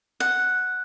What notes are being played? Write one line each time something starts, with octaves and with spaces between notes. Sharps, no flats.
F#5